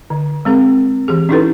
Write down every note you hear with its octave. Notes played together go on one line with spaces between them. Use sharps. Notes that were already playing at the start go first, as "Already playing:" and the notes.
D3
G#3 C4 G#4 A#4
E3 G4 G#4
C#4 D#4 E4 G4 A4 B4